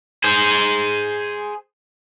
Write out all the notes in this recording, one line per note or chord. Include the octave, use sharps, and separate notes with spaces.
G#4 C5